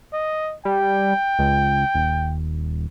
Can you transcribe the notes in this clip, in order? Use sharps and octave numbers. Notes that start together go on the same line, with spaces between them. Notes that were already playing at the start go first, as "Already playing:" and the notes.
D#5
G3 G5
C#2
D#1